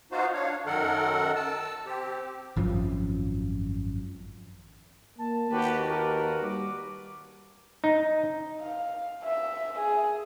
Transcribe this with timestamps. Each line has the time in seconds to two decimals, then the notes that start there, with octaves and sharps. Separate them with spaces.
0.12 B3 D#4 F4 F#4 C5 F5
0.33 D4 C#5 F5
0.66 F#2 D#3 A4 A#4 F#5
1.35 A5 E6
1.86 C4 G4
2.56 G#1 F#2 F3
5.18 A#3 A5
5.51 D#2 F#4 G4 B4
5.87 F#4 A#4 B4
6.43 G3 D6
7.84 D#4
8.61 F5
9.24 E5
9.79 G#4